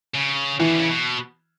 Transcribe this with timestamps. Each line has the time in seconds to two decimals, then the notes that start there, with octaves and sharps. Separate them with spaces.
0.15 C#3
0.59 B2 E3
0.70 D3
0.79 C#3
0.89 B2